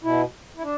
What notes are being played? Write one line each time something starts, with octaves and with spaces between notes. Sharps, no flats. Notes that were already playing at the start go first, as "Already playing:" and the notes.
B2 E4
E4
D4